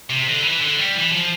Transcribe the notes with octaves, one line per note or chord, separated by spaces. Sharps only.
C3
D3
E3
D3
G3
E3
F3